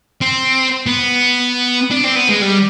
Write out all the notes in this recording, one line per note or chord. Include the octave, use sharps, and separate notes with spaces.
C4
B3
D4
C4
B3
G#3
G3